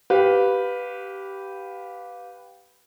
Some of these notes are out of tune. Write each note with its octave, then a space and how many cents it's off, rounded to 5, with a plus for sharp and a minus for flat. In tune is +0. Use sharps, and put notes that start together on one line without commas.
G4 -10 B4 +0 F5 +20